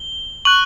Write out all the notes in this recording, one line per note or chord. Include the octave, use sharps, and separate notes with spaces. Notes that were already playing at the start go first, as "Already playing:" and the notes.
Already playing: G7
C#6 F#6 F#7